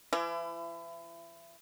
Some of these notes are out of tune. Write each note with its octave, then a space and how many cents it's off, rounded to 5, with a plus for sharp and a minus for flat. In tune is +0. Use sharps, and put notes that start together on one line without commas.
E3 +40 E4 +30